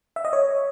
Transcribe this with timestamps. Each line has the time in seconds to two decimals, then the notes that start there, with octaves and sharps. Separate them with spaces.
0.16 E5
0.25 D#5
0.33 C#5